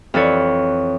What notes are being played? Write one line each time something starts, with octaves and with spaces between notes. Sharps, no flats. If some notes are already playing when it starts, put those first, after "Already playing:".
F2 E3 A4 C#5